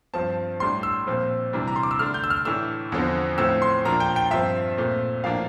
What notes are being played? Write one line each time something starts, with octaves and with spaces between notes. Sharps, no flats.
G2 F3 C4 A5
A2 G3 D4 C6
E6
A#2 F3 C4
C3 E3 G3 D4
A#5
C6
D6
E6
D3 A3 D4 F6
G6
E6
F6
A2 E3 A3 D4 E6
E2 D3 F3 C4
A2 F3 C4 E6
C6
A#2 F3 A#3 D4 A#5
G5
G5
G2 F3 C4 E5
A#2 A3 C4
A2 F3 A#3 D4 F5